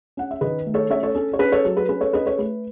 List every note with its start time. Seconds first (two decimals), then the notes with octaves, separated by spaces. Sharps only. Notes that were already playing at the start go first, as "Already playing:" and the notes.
0.17 C#4 F#5
0.31 E5
0.41 D#3 B4 D#5
0.66 A3
0.74 A4 C#5
0.90 C#4 C#5 E5
1.03 A4 C#5
1.15 C#4 A4
1.33 C#5
1.39 C#4 B4
1.52 A4 C#5
1.64 F#3 A4
1.77 B4
1.89 C#4 B4
2.01 A4 C#5
2.13 C#4 B4 D#5
2.26 A4 C#5
2.38 A3 B4